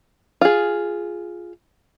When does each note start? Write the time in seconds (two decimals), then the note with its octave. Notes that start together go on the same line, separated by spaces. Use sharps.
0.41 F4 G#4